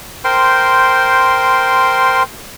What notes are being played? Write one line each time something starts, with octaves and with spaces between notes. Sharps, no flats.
A#4 C5 G5 C6